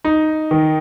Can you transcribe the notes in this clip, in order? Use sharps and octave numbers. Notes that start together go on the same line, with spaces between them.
D#4
D#3